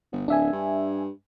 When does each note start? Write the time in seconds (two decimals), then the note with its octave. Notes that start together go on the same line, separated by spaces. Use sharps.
0.12 G1
0.28 D1 D4 E5 G#5
0.53 G2